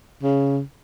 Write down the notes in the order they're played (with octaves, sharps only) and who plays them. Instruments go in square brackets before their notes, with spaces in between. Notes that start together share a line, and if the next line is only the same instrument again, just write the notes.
[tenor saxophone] C#3